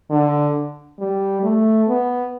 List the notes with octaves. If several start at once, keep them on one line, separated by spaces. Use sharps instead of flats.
D3
G3
A3
B3